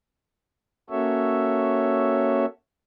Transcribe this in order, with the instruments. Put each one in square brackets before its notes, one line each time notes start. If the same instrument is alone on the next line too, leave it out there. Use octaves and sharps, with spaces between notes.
[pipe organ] A#3 C#4 F#4 A4 C#5 E5